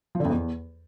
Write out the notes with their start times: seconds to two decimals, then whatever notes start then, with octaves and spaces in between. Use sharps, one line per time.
0.15 F3
0.20 D3
0.25 F2
0.30 E2